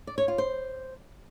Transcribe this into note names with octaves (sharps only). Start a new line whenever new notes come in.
D5
C#5
F4
C5